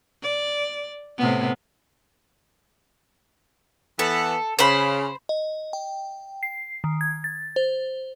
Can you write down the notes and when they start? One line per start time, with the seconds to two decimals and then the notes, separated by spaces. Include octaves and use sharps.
0.22 D5
1.18 A2 C3 B3
3.99 E3 B3 A4
4.59 C#3 C5 B5
5.29 D#5
5.73 G5
6.43 C7
6.84 D#3
7.01 G#6
7.24 A6
7.56 C5